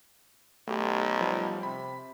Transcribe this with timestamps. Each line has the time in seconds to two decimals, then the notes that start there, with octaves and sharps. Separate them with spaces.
0.67 B1 A3 G4
1.21 F3 G3
1.63 C3 B5